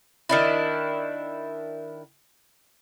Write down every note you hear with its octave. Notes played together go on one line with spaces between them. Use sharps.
D#3 D4 E4